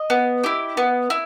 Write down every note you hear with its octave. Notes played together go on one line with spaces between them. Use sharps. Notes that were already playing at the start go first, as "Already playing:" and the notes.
Already playing: D#5
B3
E4 G4
B3
E4